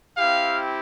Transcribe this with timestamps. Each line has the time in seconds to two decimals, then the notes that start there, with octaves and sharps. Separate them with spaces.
0.17 C4 E4 G4 F5